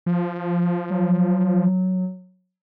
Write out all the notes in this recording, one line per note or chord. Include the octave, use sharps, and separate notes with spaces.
F3
F#3